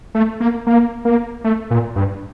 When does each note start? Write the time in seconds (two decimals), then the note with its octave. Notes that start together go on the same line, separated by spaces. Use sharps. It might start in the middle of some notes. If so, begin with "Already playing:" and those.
0.15 A3
0.40 A#3
0.67 A#3
1.05 A#3
1.44 A3
1.71 A#2
1.96 G2